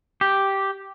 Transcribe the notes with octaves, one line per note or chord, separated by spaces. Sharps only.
G4